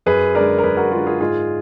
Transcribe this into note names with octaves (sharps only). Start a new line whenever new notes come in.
F#2 G#4 B4
D3 G#3 A#4 D5
A#4
F#2 G#4 B4
F#4 A#4
D3 G#3 F4 G#4
F4 G#4
G#2 F4 G#4